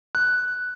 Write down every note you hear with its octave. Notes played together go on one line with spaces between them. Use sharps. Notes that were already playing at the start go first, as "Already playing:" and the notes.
F#6